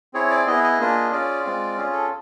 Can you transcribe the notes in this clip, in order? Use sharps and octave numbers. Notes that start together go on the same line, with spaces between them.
C4 E4 G#4 C#5
D5
B3 E4 G#4 D#5
D#5
A#3 D4 F4 G#4
C#4 F4 G#4 D5
G#3 C4 F4
C#4 F4 G#4
A4